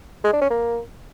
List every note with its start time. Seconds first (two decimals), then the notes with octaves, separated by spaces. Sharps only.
0.24 G#3
0.33 D4
0.42 C#4
0.50 A#3